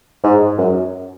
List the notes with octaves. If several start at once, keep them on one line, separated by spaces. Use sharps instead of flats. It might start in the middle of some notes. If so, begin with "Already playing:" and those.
G#2
F#2